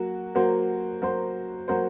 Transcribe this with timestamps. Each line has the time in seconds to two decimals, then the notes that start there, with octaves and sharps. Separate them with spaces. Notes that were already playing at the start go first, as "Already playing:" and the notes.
Already playing: F#3 A#3 F#4
0.35 F#3 A#3 F#4 C5
1.02 F#3 A#3 F#4 C5
1.68 F#3 A#3 F#4 C5